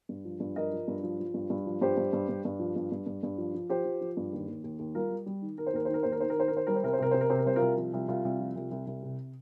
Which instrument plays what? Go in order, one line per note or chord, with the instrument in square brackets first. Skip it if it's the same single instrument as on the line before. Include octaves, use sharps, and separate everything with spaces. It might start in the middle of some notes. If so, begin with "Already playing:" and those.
[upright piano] G2
F3
G2
F3 A#4 D#5
F3
G2
F3
F3
G2
G2
F3
G2 G4 C5
G2
G2
G2
G2
F3
G2
G2
G2
G2
F3
F3
F3 G4 C5
F3
F3
G2
D#2
D#2
D#2
D#2
G3 F4 A#4
G3
G3
D#3
D#3 A#4
C5
D#2 A#4
C5
D#3 A#4
D#2 C5
A#4
D#3 C5
A#4
D#3 C5
A#4
D#3 C5
G3 A#4
C5
C2 A#4
C5
C3 A#4
C3 C5
A#4
C3 C5
A#4
C2 C5
F4 A#4
C2
F3
C2
C2 F4
C2
F3
C2
C2
C2
C3